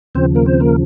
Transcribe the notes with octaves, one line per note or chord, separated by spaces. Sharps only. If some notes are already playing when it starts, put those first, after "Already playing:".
D#2 C#3 F3 C4 C5
A#3 A#4
C4 C5
A#3 A#4